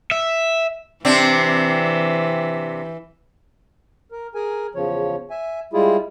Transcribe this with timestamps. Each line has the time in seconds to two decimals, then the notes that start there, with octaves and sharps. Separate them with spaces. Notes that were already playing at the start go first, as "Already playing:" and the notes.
0.11 E5
1.05 C3 E3 C4 D4
4.12 A#4
4.35 G#4 A#4 G#5
4.75 E2 C#3 F3 C#5
5.30 E5 G#5
5.73 G3 G#3 E4 F4 G#4